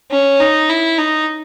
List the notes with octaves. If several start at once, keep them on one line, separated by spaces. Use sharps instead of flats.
C#4
D#4
E4
D#4